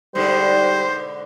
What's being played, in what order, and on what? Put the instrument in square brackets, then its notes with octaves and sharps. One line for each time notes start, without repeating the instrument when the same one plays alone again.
[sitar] G#2 B2 D3 [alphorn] G3 [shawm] C5